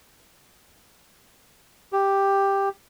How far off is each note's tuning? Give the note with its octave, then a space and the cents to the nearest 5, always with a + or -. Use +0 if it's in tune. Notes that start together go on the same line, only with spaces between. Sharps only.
G4 +5